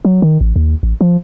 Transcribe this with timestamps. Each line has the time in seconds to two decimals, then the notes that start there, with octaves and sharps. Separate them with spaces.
0.05 F#3
0.22 D#3
0.41 A1
0.56 D#2
0.83 A1
1.01 F3